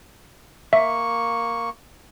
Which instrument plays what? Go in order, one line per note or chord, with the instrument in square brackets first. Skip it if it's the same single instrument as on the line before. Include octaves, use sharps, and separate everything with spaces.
[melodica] A#3 C#6 [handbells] E5